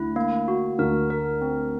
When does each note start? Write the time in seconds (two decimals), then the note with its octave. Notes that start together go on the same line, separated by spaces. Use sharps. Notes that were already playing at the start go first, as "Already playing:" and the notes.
Already playing: D2 D3 E4
0.16 A#3
0.48 F#4
0.78 D2 D3 A#4
1.10 A#4
1.42 C4